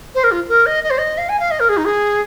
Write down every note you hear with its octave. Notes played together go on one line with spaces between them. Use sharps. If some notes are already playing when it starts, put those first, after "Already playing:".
C5
A#4
F4
A#4
D#5
D#5
C5
D#5
F5
G#5
F5
D#5
A#4
G#4
D#4
G#4